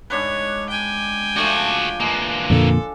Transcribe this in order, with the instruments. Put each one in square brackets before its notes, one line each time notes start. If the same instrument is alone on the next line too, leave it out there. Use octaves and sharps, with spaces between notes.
[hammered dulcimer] G#2 D4 B4 [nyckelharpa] C#5
[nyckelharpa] G5 G#5
[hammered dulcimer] F3 A3 D4 [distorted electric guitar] F#4 G#4
[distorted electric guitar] E3 A#3 [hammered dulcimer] G#3
[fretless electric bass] F2 A#2 D3 [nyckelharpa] A4